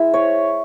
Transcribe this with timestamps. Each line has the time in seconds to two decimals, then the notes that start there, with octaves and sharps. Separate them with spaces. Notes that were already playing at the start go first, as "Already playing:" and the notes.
Already playing: G#3 E4 E5
0.14 C#5